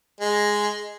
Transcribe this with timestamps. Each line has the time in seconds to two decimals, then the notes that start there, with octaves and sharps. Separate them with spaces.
0.20 G#3